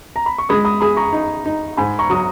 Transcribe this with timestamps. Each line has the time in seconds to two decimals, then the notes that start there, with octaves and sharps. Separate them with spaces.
0.16 A#5
0.26 B5
0.38 C#6
0.49 G#3 B5 D#6
0.65 B5 D#6
0.81 G#4 B5 D#6
0.97 A#5 C#6
1.13 D#4
1.46 D#4
1.77 G#2 G#5 B5
1.99 A#5 C#6
2.10 F#3 D#6